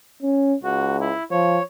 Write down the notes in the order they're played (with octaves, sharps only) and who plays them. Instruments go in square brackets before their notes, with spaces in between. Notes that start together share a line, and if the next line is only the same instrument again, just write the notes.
[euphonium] C#4
[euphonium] C#2 [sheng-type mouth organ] F#4
[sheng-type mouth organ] E4
[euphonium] F3 [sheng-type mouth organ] C#5